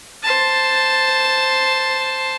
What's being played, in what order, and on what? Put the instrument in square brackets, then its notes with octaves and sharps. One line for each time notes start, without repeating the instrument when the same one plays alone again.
[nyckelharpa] C5 A5